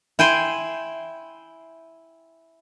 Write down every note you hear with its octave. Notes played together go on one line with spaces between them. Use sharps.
E4 G5 G#5 C6